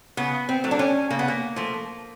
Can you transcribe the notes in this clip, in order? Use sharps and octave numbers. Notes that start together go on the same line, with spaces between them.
C#3 B3
C4
F#3 A3
D4
C#4
C#3 A#3
B3
A#3
F3 A3